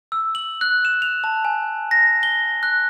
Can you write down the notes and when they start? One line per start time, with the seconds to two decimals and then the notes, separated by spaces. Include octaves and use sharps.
0.12 E6
0.35 F#7
0.61 F#6
0.85 E7
1.02 F7
1.24 A5
1.45 G#5
1.91 A#6
2.23 G7
2.63 F#6